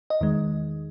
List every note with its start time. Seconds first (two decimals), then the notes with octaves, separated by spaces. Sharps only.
0.10 D#5
0.21 E2 D#3 G#3